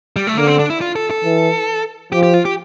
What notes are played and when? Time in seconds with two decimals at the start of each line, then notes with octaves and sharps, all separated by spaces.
0.16 G3
0.27 A3
0.37 D3 A#3
0.47 C4
0.59 D4
0.70 E4
0.81 F4
0.96 A4
1.11 A4
1.24 E3
2.12 F3 G4
2.23 G4
2.34 F4
2.45 G4